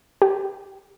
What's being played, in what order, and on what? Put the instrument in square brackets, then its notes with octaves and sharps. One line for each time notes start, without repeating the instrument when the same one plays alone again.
[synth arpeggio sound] G4